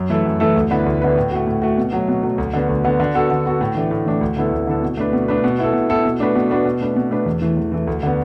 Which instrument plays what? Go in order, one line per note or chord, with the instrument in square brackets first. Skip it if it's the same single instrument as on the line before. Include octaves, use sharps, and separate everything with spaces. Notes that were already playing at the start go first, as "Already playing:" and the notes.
Already playing: [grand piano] F#2
E3 A3 E4 A4
F#2
E3 A3 E4 A4
D2
D3 B3 E4 B4
D2
D3 B3 E4 B4
A2
A3 F#4
A2
A3 F#4
B2
F#3 A3
B2
F#3 A3
D2
D3 B3
D2
D3 B3
D3
B3 F#4 A4
D3
B3 F#4 A4
A2
E3 A3 D4
A2
E3 A3 D4
D2
D3 B3 E4 A4
D2
D3 B3 E4 A4
B2
A3 D4 B4
B2
A3 D4 B4
B2
B3 E4 A4
B2
B3 E4 A4
B2
A3 D4 F#4 B4
B2
A3 D4 F#4 B4
B2
A3 D4 B4
B2
A3 D4 B4
E2
E3 A3
E2
E3 A3
D2
D3 B3